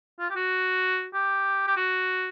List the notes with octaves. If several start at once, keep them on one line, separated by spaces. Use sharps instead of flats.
F4
G4
F#4
G4
G4
F#4